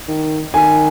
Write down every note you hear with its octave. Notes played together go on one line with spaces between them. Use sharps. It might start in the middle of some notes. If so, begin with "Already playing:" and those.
D#3
D#3 G#5